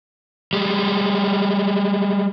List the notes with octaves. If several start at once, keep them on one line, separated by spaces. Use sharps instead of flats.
G3 G#3